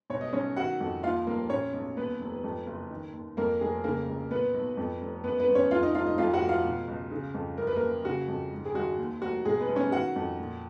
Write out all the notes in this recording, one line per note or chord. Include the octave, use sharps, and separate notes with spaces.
B2 C#5
D#5
B1 C#4 C#5
D#3 F#4 F#5
F2
D#2 F4 F5
F1 A#3 A#4
A#2 C#4 C#5
B1
D#2 B3 B4
F1
F2
F#1
D#3
D#2
F2 A#3 A#4
F1 G#3 G#4
C#3 A#3 A#4
C#2
A#2 B3 B4
B1
F2
F1
F#2 B3 B4
B3 B4
G#1
C#4 C#5
F2 F4 F5
D#4 D#5
F1 F4 F5
D#4 D#5
F2 F4 F5
F#4 F#5
F1
F4 F5
B2
C#2
C#3
F2
F#2 A#4
B4
A#3 A#4
F#1
C#3 F#4
F2
G#2
G#4
G#1 F#4
D#2
F1 F#4
B2 G#3 G#4
B3 B4
B1
C#4 C#5
D#3 F#4 F#5
F2
A#2